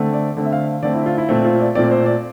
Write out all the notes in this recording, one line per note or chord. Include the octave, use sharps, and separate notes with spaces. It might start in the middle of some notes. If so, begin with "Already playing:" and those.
Already playing: D3 A3 C4
D5
D3 A3 C4
E5
F5
D3 A3 C4 D5
E4
F4
E4
A#2 A3 C4
F4
D5
A#2 A3 C4 D5
C5
D5